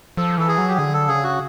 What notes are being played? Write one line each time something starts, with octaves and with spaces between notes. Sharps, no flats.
F3 A4
E3 A4
G#4
F#3
G4
D3 G#4
A4
C#3 G#4
F#4